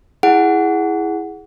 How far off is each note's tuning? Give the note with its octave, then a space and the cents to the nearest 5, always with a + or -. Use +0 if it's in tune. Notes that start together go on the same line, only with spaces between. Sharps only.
E4 +0 G#4 +0 F#5 +0